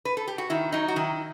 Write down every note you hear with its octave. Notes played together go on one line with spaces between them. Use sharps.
B4
A4
G4
F#4
D#3 E4
F#3 D#4
F#4
D#3 E4